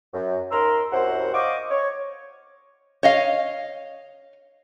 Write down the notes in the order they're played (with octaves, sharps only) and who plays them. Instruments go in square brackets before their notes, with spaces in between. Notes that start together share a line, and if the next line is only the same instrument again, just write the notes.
[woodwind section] F#2
D#2 A#4 C6 E6
C2 F#2 C5 F#5
C5 D5 D#5 F5 C#6 D6
C#5
[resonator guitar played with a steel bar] C#5 D#5 F5